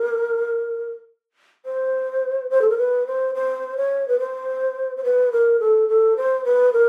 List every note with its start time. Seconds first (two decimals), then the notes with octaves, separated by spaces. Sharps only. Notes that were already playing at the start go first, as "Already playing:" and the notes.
Already playing: A#4
1.66 C5
2.50 C5
2.62 A4
2.70 A#4
2.78 B4
3.07 C5
3.35 C5
3.77 C#5
4.08 B4
4.20 C5
4.97 C5
5.04 B4
5.32 A#4
5.60 A4
5.89 A4
6.17 C5
6.45 B4
6.73 A#4